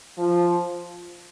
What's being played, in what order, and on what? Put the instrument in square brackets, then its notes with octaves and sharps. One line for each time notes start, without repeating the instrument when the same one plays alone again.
[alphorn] F3